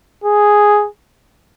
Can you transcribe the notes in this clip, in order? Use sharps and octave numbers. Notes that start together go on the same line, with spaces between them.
G#4